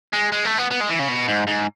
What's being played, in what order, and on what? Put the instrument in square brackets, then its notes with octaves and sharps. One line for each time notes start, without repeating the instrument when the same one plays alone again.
[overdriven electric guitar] G#3
G#3
A3
B3
B3
G#3
E3
C#3
B2
G#2
G#2